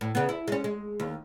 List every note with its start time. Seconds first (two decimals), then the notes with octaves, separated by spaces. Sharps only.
0.01 A2
0.15 C#3 B3
0.29 E4
0.48 G#3 C#4
0.64 G#3
1.00 D#2